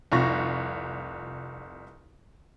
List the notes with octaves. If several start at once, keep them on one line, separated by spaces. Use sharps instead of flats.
F1 C2 F4 C#6 A#6